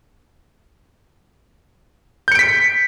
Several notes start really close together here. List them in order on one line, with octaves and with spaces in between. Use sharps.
G6 C#7 D7 B6